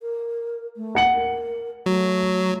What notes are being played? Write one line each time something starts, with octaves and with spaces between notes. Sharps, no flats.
A#4
A3
F#5 C#7 F#7
A#4
F#3 A3